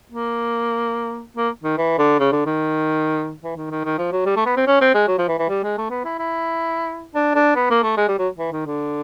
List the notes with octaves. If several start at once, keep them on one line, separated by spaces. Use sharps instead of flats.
A#3
A#3
D#3
E3
D3
C#3
D3
D#3
E3
D#3
D#3
D#3
F3
F#3
G3
A3
B3
C4
C#4
C4
G#3
F#3
F3
E3
E3
G3
G#3
A3
B3
E4
E4
D4
D4
B3
A#3
A3
G#3
G3
F#3
E3
D#3
D3